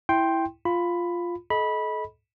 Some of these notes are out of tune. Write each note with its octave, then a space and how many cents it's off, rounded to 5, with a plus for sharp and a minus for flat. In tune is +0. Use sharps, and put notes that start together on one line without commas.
E4 +0 G5 +0 C6 +10
F4 +0 B5 +10
A4 -35 D#5 +10 B5 -15